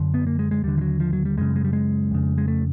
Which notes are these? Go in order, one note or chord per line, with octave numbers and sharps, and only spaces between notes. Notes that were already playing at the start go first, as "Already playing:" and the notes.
Already playing: F#2 D3
B3
A#3
G#3
G#3
D#2 D3 G3
F3
F#3
F3
F#3
G3
F#2 C#3 G#3
G#3
G3
G#3
F2 C#3
G#3
A3